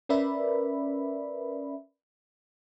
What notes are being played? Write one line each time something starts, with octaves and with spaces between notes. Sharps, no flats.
C#4 A#4 B4 D5 E5 B5